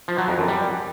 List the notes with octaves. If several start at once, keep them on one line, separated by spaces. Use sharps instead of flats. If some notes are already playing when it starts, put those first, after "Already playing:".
F3
F#3
F2
F#2
G3